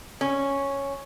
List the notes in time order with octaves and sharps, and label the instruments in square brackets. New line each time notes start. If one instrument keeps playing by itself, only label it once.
[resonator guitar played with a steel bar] C#4